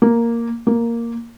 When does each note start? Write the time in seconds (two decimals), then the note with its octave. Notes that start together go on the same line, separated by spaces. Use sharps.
0.02 A#3
0.67 A#3